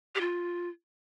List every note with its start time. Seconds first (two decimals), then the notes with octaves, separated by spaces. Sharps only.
0.15 G4
0.21 F4